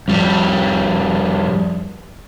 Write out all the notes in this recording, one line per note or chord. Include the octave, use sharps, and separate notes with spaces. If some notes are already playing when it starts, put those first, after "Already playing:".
F2 G3